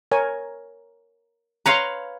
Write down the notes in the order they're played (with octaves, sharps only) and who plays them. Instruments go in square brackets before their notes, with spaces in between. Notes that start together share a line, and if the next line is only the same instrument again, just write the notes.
[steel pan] A#4 C#5 G#5
[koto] B4 C#5 F5 [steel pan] A#5 C6